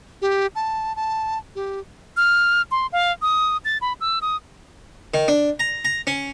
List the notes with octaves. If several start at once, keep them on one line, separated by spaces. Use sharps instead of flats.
G4
A5
A5
G4
F6
C6
F5
D#6
A6
B5
E6
D#6
D#3
D4
A#5
A#5
C#4